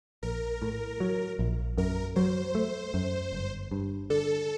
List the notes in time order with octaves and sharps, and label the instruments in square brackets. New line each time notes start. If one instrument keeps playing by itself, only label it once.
[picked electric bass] A#1 [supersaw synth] A#4
[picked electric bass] A2
F#3
A#1
[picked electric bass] F#2 [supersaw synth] A#4
[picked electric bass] F#3 [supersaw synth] C5
[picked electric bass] A3
F#2
G1
G2
[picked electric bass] D3 [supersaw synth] A4